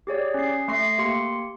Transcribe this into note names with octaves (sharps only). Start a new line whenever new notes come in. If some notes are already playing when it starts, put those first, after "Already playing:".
G4 G#4 C#5 D5
C#4 C7
A3 E5 C6 C#6 A#6 C7
A#3 G4 C6 C#7